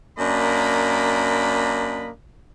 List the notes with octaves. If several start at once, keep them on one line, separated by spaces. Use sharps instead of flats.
F#2 A#3 D4 D#5 B5